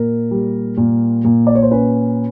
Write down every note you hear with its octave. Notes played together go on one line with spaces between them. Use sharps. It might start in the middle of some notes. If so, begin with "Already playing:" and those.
Already playing: A#2 A#4
G3
A#2
A#2
D5
C#5
C5
C#4 B4